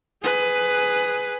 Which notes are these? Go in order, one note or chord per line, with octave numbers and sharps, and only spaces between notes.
G#4 B4